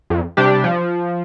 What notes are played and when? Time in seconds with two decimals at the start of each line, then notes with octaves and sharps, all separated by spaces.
0.10 F2
0.37 C3 G3 D4 G4
0.64 F3